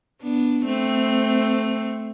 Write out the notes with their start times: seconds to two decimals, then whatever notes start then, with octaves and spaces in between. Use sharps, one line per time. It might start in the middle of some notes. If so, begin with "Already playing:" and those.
0.22 B3 D4
0.66 A3 C4